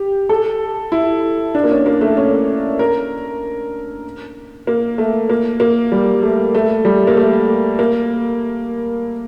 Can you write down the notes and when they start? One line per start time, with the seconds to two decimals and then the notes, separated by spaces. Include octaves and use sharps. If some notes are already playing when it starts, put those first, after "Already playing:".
Already playing: G4
0.29 A4
0.92 E4
1.55 D4
1.64 A#3
1.71 C#4
1.86 A#3
2.01 A3
2.17 C#4
2.79 A#4
4.67 A#3
4.98 A3
5.30 A#3
5.60 A#3
5.92 G3
6.23 A3
6.55 A3
6.85 G3
7.07 A#3
7.17 A3
7.79 A#3